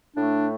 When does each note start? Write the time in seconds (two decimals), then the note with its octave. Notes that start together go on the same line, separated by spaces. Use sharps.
0.16 A2 A3 D4